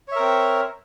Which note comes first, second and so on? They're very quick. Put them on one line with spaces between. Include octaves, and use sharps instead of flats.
C#5 E5 A#4 C4